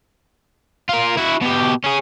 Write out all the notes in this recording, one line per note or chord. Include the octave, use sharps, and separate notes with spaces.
F4 A#4
E4 F#4
B2 G4
C#4 G#4